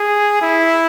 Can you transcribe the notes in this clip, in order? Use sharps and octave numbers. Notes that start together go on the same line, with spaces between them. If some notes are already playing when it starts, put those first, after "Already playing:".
Already playing: G#4
E4